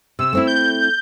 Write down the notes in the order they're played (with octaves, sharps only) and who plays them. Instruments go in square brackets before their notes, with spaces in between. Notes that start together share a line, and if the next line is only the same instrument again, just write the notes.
[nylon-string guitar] C3 [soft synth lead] E6
[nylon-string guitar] A3 C4 E4
[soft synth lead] G6